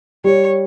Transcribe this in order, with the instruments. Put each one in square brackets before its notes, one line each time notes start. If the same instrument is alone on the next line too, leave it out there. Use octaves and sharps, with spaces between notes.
[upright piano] G3 [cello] C#5